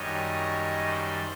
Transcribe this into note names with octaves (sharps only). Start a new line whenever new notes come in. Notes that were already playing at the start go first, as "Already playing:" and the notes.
Already playing: F#2 D#3 G3 C#5 D#5
C5 D5